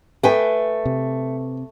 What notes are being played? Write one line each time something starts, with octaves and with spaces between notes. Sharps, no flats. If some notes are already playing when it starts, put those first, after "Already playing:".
A3 B4 G5 G#5
C3